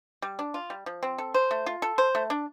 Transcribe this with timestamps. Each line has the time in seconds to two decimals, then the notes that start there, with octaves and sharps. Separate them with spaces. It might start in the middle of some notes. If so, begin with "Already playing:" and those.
0.22 G3
0.39 D4
0.54 F4
0.70 G3
0.86 F3
1.03 C4
1.18 A4
1.34 C5
1.51 A3
1.66 F4
1.82 A4
1.98 C5
2.15 A3
2.30 D4